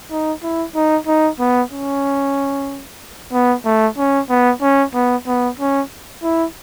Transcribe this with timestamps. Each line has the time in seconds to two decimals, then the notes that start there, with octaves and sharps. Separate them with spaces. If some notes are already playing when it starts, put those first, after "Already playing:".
0.10 D#4
0.43 E4
0.75 D#4
1.07 D#4
1.40 B3
1.72 C#4
3.33 B3
3.65 A3
3.98 C#4
4.30 B3
4.62 C#4
4.94 B3
5.27 B3
5.59 C#4
6.23 E4